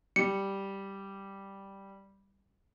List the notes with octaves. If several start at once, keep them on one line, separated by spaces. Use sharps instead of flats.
G3 C#7